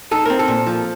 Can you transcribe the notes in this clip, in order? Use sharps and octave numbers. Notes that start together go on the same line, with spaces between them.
D#4 A4
C4 A#4
A4
A#2
F3